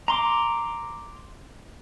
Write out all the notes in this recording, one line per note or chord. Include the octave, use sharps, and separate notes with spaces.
A#5 C6 D6